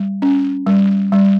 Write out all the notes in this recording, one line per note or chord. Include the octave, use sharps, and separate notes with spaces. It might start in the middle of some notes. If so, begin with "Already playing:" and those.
Already playing: G3
C#4
G3
G3